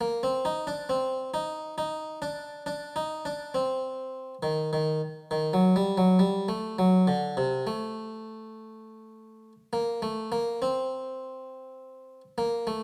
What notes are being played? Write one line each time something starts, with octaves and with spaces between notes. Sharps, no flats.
A#3
C4
D#4
D4
C4
D#4
D#4
D4
D4
D#4
D4
C4
D#3
D#3
D#3
F#3
G3
F#3
G3
A3
F#3
D3
C3
A3
A#3
A3
A#3
C4
A#3
A3